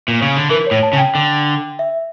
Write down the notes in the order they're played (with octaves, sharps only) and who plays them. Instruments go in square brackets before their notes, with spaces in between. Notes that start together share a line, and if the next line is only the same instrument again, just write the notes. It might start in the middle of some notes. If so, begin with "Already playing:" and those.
[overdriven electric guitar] A#2
C#3
D3
[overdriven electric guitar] E3 [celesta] A#4
[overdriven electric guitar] A2 [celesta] C#5
[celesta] A5
[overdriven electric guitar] C#3
[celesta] G5
[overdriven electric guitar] D3
[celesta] E5